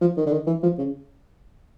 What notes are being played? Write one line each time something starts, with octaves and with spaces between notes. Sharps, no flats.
F3
D#3
D3
D#3
E3
F3
C#3